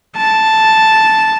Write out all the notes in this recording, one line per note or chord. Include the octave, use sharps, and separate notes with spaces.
A5